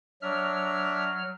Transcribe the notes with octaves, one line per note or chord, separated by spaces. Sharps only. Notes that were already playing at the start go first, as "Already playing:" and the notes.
F#3 D4 E5 F6